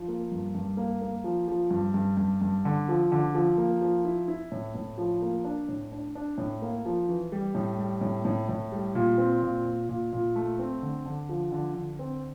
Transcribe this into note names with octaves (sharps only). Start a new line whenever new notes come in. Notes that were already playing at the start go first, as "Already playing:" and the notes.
Already playing: F3
A#3
G2
G2
A#3
A#3
F3
F3
G2
G2
G2
G2
D3
F3
D3
F3
A#3
F3
E4
E4
A2
A2
F3
A#3
D4
A2
D4
D4
A2
A#3
F3
E3
G3
A2
G3
A2
A2
A2
G3
A#2
C4
A#2
A#2
A#2
A#2
A3
C4
D3
D3
F3
D3
D3
C4